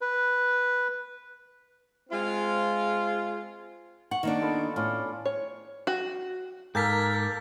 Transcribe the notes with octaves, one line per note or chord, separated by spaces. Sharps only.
B4
G#3 C4 F4
F#5 C#6
D#3 A#3 D4
B3 F4 A4
A2 C#4 D4 F4
C#5
F#4
G#2 A#3 A4 A#4 G#5 G6 A6 B6